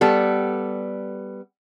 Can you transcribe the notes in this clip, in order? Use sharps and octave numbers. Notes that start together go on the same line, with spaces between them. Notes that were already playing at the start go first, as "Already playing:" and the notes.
G3 B3 A4